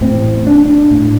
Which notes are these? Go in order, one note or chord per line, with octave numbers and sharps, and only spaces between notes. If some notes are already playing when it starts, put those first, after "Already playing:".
A1 A2 C4
D4
D4
A2